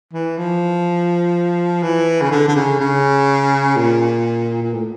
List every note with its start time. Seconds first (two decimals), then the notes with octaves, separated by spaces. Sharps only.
0.13 E3
0.38 F3
1.83 E3
2.22 C#3
2.31 D3
2.48 D3
2.56 C#3
2.80 C#3
3.77 A#2
4.62 A#2
4.74 A2